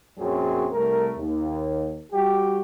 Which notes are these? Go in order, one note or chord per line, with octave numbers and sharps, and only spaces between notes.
A#1 F#2 F#3 C4 G#4
C2 A3 A#4
D#2
G3 F#4 G4